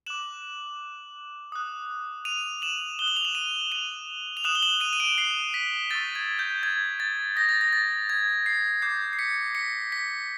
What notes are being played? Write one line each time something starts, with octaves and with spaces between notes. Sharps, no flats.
D6 F#6 E7 F#7
D#6 F#6
D#7 F7
E7 F#7
D#6 F#6 G7
F#7
F7
E7 F#7
D#7 F7
D#7 F7
F7
D#6 F#6 E7 F#7
G7
E7 F#7
D#7 F7
D#7
D7 E7
C7
B6
C#6 E6 G6 A6
G#6
G6
G#6
A6
D#6 G6 A#6
A6
A#6
A6
G#6
C7
D6 G6 C7
C7
B6 C#7
B6 C#7
B6